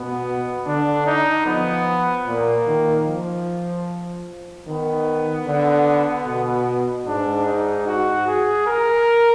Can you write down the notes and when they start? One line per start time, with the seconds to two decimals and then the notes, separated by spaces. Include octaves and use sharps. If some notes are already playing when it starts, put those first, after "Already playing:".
Already playing: B2 B3
0.66 D3 D4
1.06 D#4
1.46 F3 B3
2.26 A#2 A#3
2.67 D#3
3.07 F3
4.67 D#3 B3
5.47 D3
6.27 B2
7.07 G#2 D4
7.46 D#4
7.87 F#4
8.27 G#4
8.67 A#4